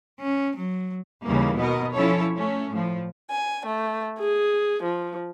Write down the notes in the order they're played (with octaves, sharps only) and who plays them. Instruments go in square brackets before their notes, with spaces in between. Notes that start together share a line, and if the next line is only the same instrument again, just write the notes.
[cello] C#4
F#3
[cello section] D#2 C#3 E3 G3 A#3
B2 B3 A#4 D#5
F3 C#4 E4 A4 C#5
A3 C#4
A2 F3
[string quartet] G#5
A3
G#4
F3